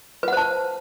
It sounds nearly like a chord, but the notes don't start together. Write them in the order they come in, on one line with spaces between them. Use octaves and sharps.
B4 F#5 C5 A5